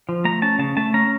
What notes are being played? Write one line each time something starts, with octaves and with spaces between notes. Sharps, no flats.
F3
A3 A#5
C#4 A5
C#3 A5
A3 A5
C#4 A#5